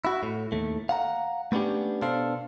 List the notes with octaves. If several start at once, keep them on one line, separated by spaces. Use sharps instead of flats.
E4 F#4
A2
D#2 A3
F5 F#5 A#5
A3 B3 C#4 D4 G4
B2 D4 A4 C5 F5